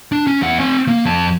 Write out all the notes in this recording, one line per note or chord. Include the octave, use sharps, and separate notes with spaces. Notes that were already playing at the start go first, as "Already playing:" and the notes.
D4
C#4
E2 F#5
C4 G#5
A#3
F2 A5